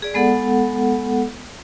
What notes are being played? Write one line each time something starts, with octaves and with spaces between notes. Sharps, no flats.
G#4 D5
G#3 B3 A4 F#5